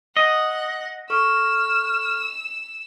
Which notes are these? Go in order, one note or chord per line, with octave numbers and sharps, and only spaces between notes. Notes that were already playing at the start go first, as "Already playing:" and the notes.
D#5 F#5
A4 C#6 E6 F6